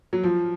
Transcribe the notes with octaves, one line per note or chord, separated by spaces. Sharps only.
F#3
F3